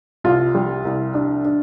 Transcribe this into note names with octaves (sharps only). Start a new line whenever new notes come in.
C2 F4
G3
C2
D4
D4